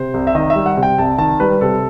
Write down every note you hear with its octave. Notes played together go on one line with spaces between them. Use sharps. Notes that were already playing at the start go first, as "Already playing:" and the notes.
Already playing: C3 C5
C2
E5
D#3 D#5
E5
G3
F#5
C3
G5
C2 A5
D#3 A5
G3 B4
C3 A4